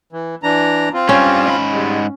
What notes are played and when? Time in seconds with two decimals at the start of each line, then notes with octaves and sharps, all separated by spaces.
0.12 E3
0.43 E3 D4 A#5
0.93 C4 F4
1.09 G2 G3 C#4
1.47 G#2 B5
1.73 G3 G#3